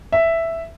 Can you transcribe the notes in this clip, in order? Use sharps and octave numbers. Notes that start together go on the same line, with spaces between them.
E5